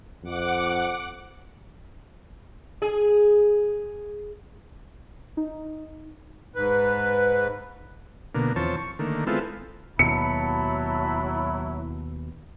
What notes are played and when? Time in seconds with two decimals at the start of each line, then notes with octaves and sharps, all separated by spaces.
0.24 F2 F#5 D6
2.82 G#4
5.37 D#4
6.56 G#2 B4
8.35 B2 D3 A#3
8.56 E2 F3 C4 C#5 A5
8.78 C#6
8.99 D3 D#3 A3 A#3
9.27 G#3 B3 C4 E4 F4 A4
9.99 D#2 B2 F#3 E4 A5 B5 C#7